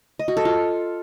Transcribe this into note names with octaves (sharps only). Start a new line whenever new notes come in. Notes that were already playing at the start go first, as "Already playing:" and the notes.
D#5
F#4
A4
F4